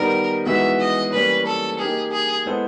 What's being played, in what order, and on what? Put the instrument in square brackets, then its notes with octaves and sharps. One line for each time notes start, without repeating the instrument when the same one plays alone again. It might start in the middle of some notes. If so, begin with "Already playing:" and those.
Already playing: [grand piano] D#3 G3 B3 D#4 [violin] A#4
[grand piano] E3 G#3 B3 D#4 F#4 [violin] E5
[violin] D#5
[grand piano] E3 G3 A#3 C#4 [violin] B4
[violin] A4
[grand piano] A#3 D#4 G4 A#4 [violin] G#4
[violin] G#4
[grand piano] G#3 B3 E4 A4 C5